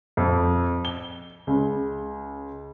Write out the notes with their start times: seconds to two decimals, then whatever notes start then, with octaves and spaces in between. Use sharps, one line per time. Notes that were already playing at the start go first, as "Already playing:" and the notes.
0.17 F2
0.85 G7
1.47 C#2